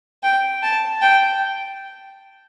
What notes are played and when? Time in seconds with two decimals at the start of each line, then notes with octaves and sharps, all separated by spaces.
0.23 G5
0.63 A5
1.02 G5